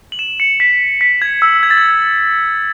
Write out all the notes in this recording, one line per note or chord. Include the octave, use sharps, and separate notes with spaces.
F#7
E7
C#7
B6
B6
G#6
E6
G#6
A6
G#6